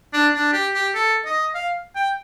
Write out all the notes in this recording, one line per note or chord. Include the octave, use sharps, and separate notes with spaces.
D4
D4
G4
G4
A4
D#5
F5
G5